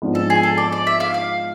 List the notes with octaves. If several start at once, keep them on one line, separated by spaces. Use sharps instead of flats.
G#2 F3 B3 D4 F4
A4
G#4
A4
D5
D5
E5
F5
F5